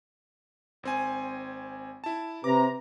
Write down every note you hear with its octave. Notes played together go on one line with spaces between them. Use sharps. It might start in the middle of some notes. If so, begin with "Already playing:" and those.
G#1 C4 G#5
E4 A5
C3 B4 A#5 D6